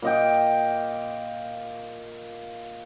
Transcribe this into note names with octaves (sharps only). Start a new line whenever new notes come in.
A#2 D#5 G5